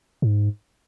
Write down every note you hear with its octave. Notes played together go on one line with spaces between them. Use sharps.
G#2